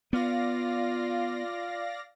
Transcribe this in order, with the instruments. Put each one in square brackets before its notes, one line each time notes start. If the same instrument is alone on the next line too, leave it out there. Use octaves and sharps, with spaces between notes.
[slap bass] B3 [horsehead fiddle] F4 [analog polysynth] D5 F5 A#6